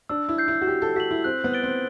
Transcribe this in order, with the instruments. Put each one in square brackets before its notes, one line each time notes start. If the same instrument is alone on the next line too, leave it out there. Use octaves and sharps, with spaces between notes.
[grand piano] D4 [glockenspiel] E6
[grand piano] E4
[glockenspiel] G6 C7
[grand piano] E4
F#4
[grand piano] G4 [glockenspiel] G6
[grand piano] A4
[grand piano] F#4 [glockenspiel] B6 F#7
[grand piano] E4
[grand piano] C4 [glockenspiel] F#6
[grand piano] B3
[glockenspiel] A6 D7 G7
[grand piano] C4